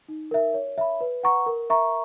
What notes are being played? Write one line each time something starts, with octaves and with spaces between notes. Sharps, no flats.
D#4
A#4 E5
C#5
E5 B5
B4
F#5 A#5 C#6
A#4
E5 A#5 C#6